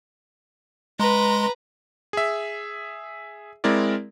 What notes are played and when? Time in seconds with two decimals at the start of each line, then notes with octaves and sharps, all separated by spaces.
1.00 G#3 B4 A#5 C6
2.13 G#4 E5
3.64 G#3 C4 E4 A#4 D5